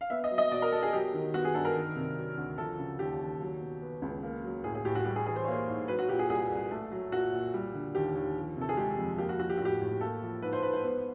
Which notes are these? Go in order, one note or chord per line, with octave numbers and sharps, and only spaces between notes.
F5
B3 E5
D#5
F#3
D#5
B2 D5
A#4
B2 A4
G#4
F#3 G4
D#3
B3 F#4
G#4
G2 A4
A#4
D#3
C3
F#3
D2
F3 A4
C#3
D#2 G4
D#2
F#3
B2
B3
C#2
A#3
F#3
A2 G#4
G#4
A2 G4
F#4
G3 G4
G#4
E3 G#4
C5
C#5
A#3 C5
G#2
F#3 B4
F#4
A#2 G4
G#4
C2 G#4
C2
A3
F#3
A#2 F#4
A#2
G3
D3
D#2 G4
D#2
F3
C3 A4
G#4
G#3 G4
F2
A#3 G4
F#4
F3 F#4
G4
A2 F#4
G4
A2
A#3 A4
F3
G#2 B4
C5
G#2 B4
C5
B3